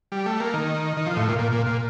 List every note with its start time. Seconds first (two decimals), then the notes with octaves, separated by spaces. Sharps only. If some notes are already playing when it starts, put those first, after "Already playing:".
0.12 G3
0.26 A3
0.40 A#3
0.54 D#3
0.97 D#3
1.06 F3
1.17 A2
1.28 A#2
1.39 A#2
1.52 A#2
1.66 A#2